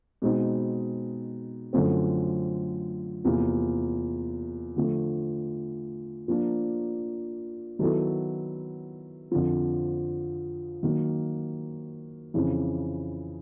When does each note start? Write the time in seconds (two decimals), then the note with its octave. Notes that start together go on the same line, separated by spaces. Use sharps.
0.22 B2 G#3 C4 D#4
1.73 F#2 D3 F3 A3 C4
3.24 E2 C3 F3 A#3
4.76 D3 F3 A3
6.28 F3 A#3 D4
7.79 D#3 F#3 B3 E4 A4
9.31 F2 D3 F3
10.83 D#3 F#3 A#3
12.34 F2 C#3 E3